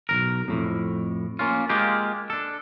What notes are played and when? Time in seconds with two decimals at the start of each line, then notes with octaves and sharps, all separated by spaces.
0.09 B1 F2 A#4
0.48 F2 A2 C3
1.39 A#3 C#4 F4
1.69 G#3 A#3 F4 G4
2.30 D4 A4